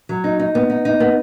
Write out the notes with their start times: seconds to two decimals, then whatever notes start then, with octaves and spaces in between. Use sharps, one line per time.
0.09 F#3
0.24 D#4
0.40 D#4
0.55 B3
0.70 D#4
0.85 D#4
1.00 B3